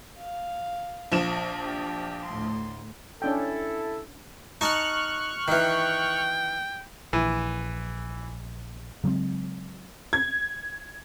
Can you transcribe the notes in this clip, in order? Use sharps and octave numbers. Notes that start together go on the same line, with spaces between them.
F5
A#1 F3 E7
D4 G4
D2 A2 C6
C#4 D4 E4 A4 G5
D#4 A5 C#6 F6 F#6
D#3 E3 G5
A#1 E3
C#3 F#3 G#3 C4
G#6